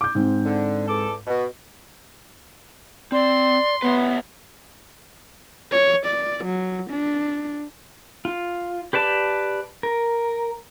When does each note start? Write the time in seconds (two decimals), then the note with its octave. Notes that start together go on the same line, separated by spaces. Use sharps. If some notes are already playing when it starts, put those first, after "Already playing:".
0.01 D6 G6
0.15 G#2 C4
0.44 D3
0.88 E2 A4 D6
1.27 B2
3.12 C4 D5 C6
3.82 B3 B4 C#5 E5
5.71 C#5
6.06 D5
6.44 F#3
6.90 D4
8.25 F4
8.93 G4 B4 D5 A5
9.83 A#4